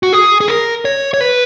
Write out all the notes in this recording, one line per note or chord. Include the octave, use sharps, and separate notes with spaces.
F#4
G#4
G#4
A#4
C#5
C#5
B4